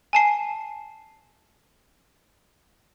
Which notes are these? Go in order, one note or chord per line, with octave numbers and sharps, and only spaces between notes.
G#5 A5 C7